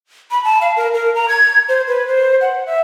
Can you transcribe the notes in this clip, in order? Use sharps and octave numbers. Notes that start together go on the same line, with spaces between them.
B5
A5
F5
A#4
A#4
A#5
G#6
C5
B4
C5
F#5
E5